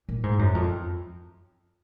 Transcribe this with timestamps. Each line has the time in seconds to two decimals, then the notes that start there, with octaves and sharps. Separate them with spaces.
0.09 A#2
0.23 G#2
0.39 F#2
0.54 F2